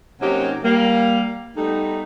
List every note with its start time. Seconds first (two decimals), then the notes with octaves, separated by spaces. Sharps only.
0.21 C3 F#3 A#3 C#4 D#4 G4
0.65 G3 A#3
1.57 G3 A3 B3 D#4